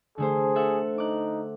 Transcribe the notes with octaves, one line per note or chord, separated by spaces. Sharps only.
D3 A3 G#4 C5
A4 E5 F#5
D#4 D6 F#6